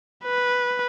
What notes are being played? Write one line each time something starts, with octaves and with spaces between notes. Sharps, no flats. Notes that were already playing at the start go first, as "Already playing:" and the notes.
B4